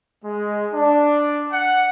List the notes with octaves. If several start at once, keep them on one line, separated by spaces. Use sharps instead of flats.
G#3
D4
F#5